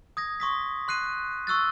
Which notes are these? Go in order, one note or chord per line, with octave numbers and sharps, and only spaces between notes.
D#6 G#6 A#6
C6 C#6 D#6 B6
C6 F#6 C7 D#7
C#6 E6 F#6 A6